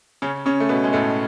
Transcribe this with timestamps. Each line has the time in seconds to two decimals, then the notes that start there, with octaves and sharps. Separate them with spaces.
0.22 C#3 C#4
0.46 C#3 C#4
0.60 A3
0.69 B2 B3
0.84 G#3
0.93 A2 A3